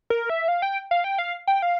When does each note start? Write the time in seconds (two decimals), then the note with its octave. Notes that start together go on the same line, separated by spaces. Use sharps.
0.10 A#4
0.29 E5
0.48 F5
0.62 G5
0.91 F5
1.04 G5
1.18 F5
1.47 G5
1.62 F5